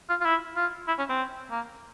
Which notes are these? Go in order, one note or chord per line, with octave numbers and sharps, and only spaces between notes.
F4
F4
E4
F4
E4
C#4
C4
A#3